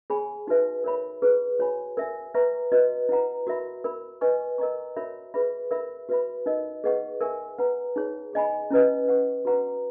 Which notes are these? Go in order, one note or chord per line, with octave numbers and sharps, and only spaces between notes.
G#4 C#5 G#5 B5
D#4 F#4 B4 E5
A#4 C#5 E5 B5
E4 G#4 B4
F#4 C#5 G#5 B5
A#4 E5 G#5
B4 E5 A#5 C#6
F#4 B4 D#5
E4 B4 F#5 A#5
F#4 A#4 E5 B5
A#4 E5 B5
B4 D#5 G#5 C#6
A#4 D#5 A#5 C#6
F#4 A#4 C#5 E5 B5
G#4 B4 E5 B5
E4 A#4 E5 B5
F#4 B4 E5 B5
D#4 A#4 D#5
G#4 B4 D#5 F#5 C#6
A#4 E5 G#5 C#6
B4 F#5 A#5
D#4 G#4 C#5
G#4 D#5 G#5 B5
C#4 E4 B4 D#5
B4 F#5 C#6
F#4 B4 F#5 A#5 C#6